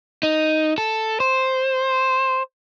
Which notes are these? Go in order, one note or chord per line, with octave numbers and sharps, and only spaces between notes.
D#4
A4
C5